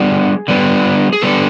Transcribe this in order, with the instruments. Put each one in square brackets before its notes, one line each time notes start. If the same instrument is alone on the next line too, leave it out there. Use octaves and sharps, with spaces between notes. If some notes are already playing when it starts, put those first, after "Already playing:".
Already playing: [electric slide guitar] D3 G3 B3 G#4
D3 G3 B3
G#4
D3 G3 B3 A4